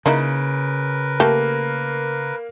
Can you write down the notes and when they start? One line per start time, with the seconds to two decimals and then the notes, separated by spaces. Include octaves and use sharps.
0.06 C#3 A#3 D#4 E4 A#4 B4
1.20 A3 A#3 G4 A4